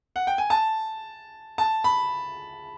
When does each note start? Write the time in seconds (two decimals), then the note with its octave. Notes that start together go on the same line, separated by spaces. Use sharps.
0.16 F#5
0.27 G5
0.38 G#5
0.50 A5
1.58 A5
1.84 B5